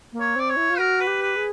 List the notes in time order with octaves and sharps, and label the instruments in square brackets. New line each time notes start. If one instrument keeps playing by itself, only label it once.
[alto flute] A#3
[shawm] C#5
[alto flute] C4 [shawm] D5
[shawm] C#5
[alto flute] E4
F4
[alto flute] F#4 [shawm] A#4
[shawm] B4
[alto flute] G4
[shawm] B4
[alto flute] G#4